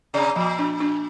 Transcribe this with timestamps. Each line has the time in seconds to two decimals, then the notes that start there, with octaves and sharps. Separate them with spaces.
0.14 C3 D5
0.36 A#2 F3
0.59 D4
0.80 D4